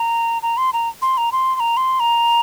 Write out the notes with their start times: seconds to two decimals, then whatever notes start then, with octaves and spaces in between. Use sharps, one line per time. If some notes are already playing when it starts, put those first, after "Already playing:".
Already playing: A#5
0.43 A#5
0.57 C6
0.73 A#5
1.02 C6
1.18 A#5
1.32 C6
1.55 C6
1.60 A#5
1.77 C6
2.00 A#5